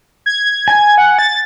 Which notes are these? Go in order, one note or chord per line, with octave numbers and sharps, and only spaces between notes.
G#6
G#5
F#5
A6